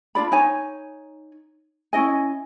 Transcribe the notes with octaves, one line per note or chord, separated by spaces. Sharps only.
D4 F4 D5 B5
D#4 C#5 G#5
C#4 E4 D#5 G#5